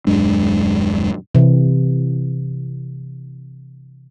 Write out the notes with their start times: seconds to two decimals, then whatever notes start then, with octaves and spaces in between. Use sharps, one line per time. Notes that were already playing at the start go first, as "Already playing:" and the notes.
0.07 D#1 F#2 G#3 D4
1.35 C3 E3